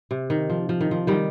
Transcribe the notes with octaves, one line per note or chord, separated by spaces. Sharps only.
C3
D#3
F3
F3
D#3
F3
D#3 G3